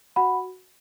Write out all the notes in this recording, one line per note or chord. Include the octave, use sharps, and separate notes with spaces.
F#4 F#5 B5